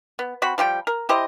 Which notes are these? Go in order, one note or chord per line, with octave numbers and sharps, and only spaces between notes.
B3
C4 F#4 B5
F3 G3 F#4 G5
A#4
E4 G4 C5 D#5